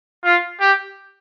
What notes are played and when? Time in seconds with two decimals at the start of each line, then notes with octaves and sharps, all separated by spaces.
0.24 F4
0.60 G4